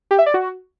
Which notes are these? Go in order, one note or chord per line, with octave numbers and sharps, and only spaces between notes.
G4
E5
D5
F#4